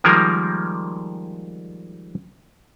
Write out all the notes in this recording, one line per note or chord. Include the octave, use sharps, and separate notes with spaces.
D#3 F3 G3 G#3 A#3 A#4